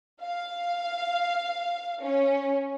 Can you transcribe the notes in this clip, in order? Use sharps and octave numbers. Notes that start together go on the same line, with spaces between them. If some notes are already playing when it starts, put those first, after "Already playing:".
F5
C#4